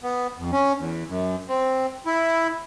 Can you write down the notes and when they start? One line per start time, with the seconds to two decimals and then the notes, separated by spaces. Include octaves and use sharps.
0.03 B3
0.38 F2
0.52 C#4
0.78 E2
1.08 F#2
1.48 C4
2.06 E4